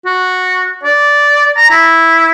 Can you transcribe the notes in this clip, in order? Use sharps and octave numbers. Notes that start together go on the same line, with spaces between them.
F#4
D5
A#5
E4